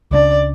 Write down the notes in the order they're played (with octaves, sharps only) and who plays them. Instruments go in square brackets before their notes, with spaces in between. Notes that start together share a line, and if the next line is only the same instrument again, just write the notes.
[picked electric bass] C#2 C#3 G#3 D4 [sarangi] D5